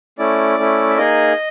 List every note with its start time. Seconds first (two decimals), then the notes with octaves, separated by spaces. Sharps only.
0.18 A3 C#4 E4 D5
0.58 A3 C#4 E4
0.90 E5
0.97 A#3 D#4 G#4 D#5